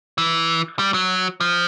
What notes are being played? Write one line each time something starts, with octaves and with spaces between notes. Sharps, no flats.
E3
G3
F#3
F3